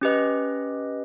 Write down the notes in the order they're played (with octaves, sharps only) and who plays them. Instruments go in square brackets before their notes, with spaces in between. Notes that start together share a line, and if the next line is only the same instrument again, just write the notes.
[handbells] C#4 G4 B4 D#5